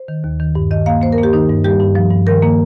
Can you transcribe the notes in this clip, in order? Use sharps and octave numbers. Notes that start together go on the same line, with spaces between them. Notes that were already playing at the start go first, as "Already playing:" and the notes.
Already playing: C5
D#3
D#2
D#3
G2
D#3 D#5
A#3 F5
A#3 C5
A#4
A#3
G4
D#3 D#4
G2
G3 G4
G2
F3
G2
D#3 A#4
A#3